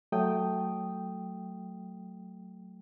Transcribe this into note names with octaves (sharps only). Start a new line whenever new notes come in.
F#3 A3 G5 D#6